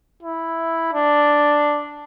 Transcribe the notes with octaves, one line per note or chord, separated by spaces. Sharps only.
E4
D4